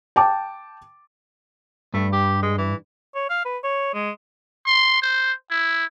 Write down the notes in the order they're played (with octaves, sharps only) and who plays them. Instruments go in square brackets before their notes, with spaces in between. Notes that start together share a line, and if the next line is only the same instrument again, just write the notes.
[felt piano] G5 A5 D6
[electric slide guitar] G2 [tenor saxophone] A3
[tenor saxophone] G4
G#3
E3
[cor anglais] C#5
F5
B4
C#5
G#3
[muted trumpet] C6
C5
E4